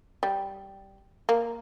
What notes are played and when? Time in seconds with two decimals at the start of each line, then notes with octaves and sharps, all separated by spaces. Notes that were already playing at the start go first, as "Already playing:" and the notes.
0.23 G3
1.29 A#3